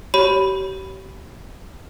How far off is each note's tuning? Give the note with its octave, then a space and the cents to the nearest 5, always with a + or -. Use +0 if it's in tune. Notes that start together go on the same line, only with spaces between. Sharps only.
G4 -35 C#5 +0 B5 +0